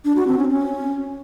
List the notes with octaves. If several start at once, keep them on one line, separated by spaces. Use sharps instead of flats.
D4
F#4
C4
C#4
C#4